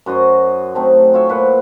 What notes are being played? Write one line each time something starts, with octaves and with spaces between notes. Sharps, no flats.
F#2 F#4 C5 D#5
A3 C4 D#4 A4
F4 C#5 E5
A#2 B4 C5 F#5